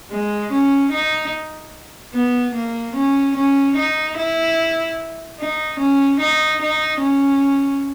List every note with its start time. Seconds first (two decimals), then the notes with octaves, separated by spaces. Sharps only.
0.11 G#3
0.52 C#4
0.92 D#4
2.13 B3
2.55 A#3
2.96 C#4
3.37 C#4
3.76 D#4
4.17 E4
5.40 D#4
5.80 C#4
6.20 D#4
6.62 D#4
7.01 C#4